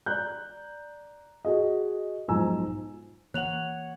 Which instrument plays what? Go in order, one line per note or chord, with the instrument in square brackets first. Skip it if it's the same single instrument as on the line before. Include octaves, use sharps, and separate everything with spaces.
[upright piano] D5 A#5 F#6 G6
F#4 G#4 D#5
B1 G#2 F3 G#5 A#5 E6
[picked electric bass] E3 A#3 [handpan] C#5 F#5 [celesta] F#6 F7 F#7